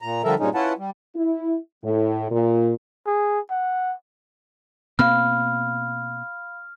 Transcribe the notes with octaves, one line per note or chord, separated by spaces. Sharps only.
A#2 A#5
D3 F3 G3 A4 A#4 E5
G2 A#2 G#3 C#4 D#4
C#4 E4 F4 B4 F#5 A5
G3
E4
A2
A#2
G#4
F#5
B2 A#3 C4 F5 B5 F6